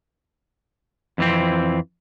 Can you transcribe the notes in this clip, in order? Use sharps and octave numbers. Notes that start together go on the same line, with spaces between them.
F2 E3 C4